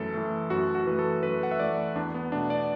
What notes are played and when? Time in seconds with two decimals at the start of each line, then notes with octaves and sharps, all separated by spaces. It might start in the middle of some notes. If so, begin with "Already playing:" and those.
Already playing: F#2 E3 A3 A4
0.14 E3 A3
0.50 F#2 F#4
0.75 F#4
0.86 E3 A3 B4
0.99 A4
1.23 F#2 B4
1.43 F#5
1.51 E5
1.60 E3 A3 D5
1.95 E2 D4
2.14 B3
2.32 B2 A3 D4
2.50 D5